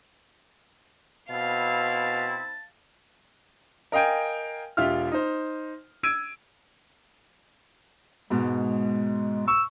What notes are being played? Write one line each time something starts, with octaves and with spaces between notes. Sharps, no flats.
B2 C4 E4 F5 A5
A#4 D#5 F5 G5 G#5
E1 F4 G4 E5 F6
D#4 C5
E6 G#6 D7 D#7
G#2 B2 G#3
C#6 E6